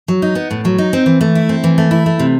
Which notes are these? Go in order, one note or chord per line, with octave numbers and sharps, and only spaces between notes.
F#3
D#4
B3
A2
F#3
D#4
C4
E3
A3
E4
C4
E3
A3
E4
A3
C3